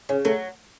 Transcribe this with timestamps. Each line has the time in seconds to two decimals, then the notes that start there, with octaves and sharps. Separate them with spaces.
0.09 C#3 C#4
0.25 F#3 A3